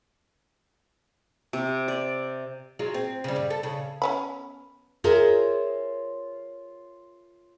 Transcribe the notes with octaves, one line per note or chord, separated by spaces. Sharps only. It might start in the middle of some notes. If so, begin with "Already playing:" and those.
C3
D5
F#3 G#3 F4
C4
C#3 G3
G2
A4
C#3
B3 C#4 B5
F4 G#4 A#4 C5 C#5 E5